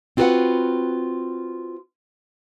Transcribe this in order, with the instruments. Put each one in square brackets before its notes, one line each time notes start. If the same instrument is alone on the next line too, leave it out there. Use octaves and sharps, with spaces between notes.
[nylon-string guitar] C4 F4 F#4 A4 B4 F#5